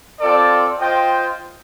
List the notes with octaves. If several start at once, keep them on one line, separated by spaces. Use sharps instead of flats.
C4 F4 A4 D5
F4 C5 D#5 G5